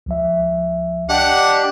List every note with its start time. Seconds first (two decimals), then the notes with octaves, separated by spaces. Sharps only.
0.06 C#2 F3 E5
1.09 D4 G4 D#5 F#5